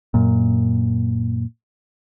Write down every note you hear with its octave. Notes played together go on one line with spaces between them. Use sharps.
F#2 A#2